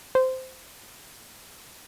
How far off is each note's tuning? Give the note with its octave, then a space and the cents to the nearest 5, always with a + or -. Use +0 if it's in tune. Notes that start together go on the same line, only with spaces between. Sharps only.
C5 -10